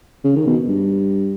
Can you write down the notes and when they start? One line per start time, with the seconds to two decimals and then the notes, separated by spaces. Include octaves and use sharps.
0.24 C#3
0.36 D#3
0.47 B2
0.68 G2